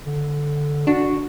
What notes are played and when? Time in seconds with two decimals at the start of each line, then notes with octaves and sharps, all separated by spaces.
0.06 D3
0.87 D4 F#4